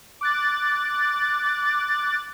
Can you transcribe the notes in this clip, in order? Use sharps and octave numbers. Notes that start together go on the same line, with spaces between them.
D6 F#6 A6